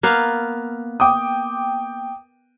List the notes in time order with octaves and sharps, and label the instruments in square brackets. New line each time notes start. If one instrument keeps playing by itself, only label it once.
[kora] A#3 B3 F5
[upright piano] G5 D6 D#6